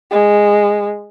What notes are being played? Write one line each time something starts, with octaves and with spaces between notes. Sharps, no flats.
G#3